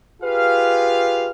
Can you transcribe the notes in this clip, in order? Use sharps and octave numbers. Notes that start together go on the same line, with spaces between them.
F4 G4 G#4 B4 F5